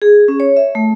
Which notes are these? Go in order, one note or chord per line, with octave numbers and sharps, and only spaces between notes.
G#4
C#4
C#5
E5
A3